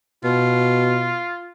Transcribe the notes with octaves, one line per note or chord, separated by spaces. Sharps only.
B2 F4